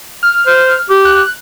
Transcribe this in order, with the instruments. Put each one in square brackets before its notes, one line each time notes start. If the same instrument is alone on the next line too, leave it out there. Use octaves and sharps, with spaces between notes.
[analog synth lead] F6
[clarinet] C5
G4
[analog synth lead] F#6